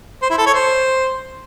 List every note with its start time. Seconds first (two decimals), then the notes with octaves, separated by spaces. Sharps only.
0.22 C5
0.30 E4
0.38 A4
0.46 C#5
0.54 C5